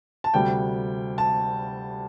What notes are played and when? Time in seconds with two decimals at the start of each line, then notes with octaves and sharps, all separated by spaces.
0.24 A5
0.34 D2 C3 G3 G5
1.18 A5